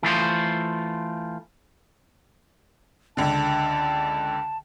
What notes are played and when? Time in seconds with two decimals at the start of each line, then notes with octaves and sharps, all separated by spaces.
0.03 E3 A3 F4 C5
3.17 C#2 D3 A5